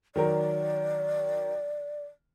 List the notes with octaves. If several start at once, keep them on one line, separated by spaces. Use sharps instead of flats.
D#3 F#3 A#4 D5